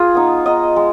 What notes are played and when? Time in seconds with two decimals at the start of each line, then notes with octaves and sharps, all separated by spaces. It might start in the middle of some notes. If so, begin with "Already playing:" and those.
Already playing: F4 G#4
0.15 B3 D#4
0.46 B3 D#4 D#5
0.76 G#3